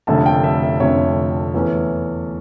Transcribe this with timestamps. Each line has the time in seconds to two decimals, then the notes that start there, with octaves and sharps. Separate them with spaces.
0.07 F1 F2 D3 A3 C#4 A5
0.26 G5
0.44 E5
0.63 E5
0.80 F1 F2 D3 A3 C#4 C#5
1.54 E2 E3 A3 C#4